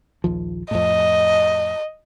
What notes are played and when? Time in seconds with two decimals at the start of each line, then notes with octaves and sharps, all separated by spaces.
0.24 A#1 D#2 F3
0.71 F2 A2 D#5